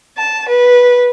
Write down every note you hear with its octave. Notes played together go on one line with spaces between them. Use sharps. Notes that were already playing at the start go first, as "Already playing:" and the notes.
A5
B4